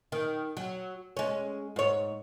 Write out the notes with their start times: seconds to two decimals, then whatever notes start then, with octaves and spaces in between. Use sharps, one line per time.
0.12 D#3
0.57 F#3
1.17 G#3 C#4
1.76 G#2 C#5